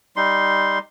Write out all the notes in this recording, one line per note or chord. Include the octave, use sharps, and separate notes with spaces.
G3 D#4 C6